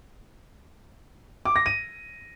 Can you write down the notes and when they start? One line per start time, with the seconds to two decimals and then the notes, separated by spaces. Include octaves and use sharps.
1.45 D6
1.56 A#6
1.66 D#7